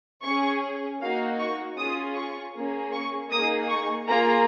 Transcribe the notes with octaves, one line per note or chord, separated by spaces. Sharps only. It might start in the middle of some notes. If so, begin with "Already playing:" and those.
C#4 G#4 C#6
A#3 D#4 F#4 F5
C#6
C#4 F4 G#4 D#6
C#6
A#3 C#4 G#4
C#6
A#3 D#4 G#4 D#6
C#6
A#3 F4 G#4 A#5